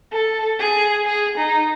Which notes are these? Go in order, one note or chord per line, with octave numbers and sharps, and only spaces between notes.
A4
G#4
G#4
D#4